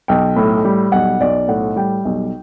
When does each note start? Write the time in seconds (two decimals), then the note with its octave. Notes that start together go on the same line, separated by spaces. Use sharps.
0.08 B1 G5
0.36 A2
0.65 G3
0.92 B1 F#5
1.21 B1 D5
1.48 A2 F#5
1.76 G3 G5
2.05 B1